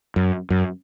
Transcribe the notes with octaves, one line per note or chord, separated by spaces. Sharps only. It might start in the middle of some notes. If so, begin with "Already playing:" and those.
F#2
F#2